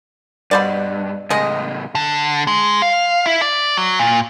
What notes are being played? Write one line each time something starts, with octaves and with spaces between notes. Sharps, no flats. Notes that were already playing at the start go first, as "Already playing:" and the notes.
G2 B2 C5 D5
A2 C#3 G#3 D#5
D3
G#3
F5
E4
D5
F#3
A#2